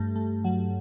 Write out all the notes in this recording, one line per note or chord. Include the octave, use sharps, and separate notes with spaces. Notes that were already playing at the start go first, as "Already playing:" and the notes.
Already playing: G2 A3
A3
F#3